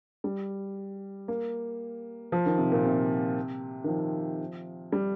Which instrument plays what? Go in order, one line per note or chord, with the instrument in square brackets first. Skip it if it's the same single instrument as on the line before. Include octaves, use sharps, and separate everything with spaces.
[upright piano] G3
A#3
F3
D#3
C3
A#2
C3
D#3
F3
G3